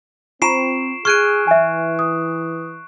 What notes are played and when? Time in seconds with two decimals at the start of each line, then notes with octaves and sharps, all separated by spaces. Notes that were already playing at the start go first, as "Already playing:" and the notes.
0.42 C4 F4 A#5 C#6 C7 D7 E7
1.05 G#4 C#6 F6 F#6 G#6 D7 D#7
1.47 E3 E5 G#5
1.99 D#6